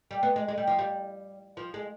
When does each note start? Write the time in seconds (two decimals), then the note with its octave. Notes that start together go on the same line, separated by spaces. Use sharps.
0.11 G3
0.23 B3
0.36 G#3
0.48 G#3
0.58 G3
0.67 F3
0.79 G3
1.57 F3
1.74 G#3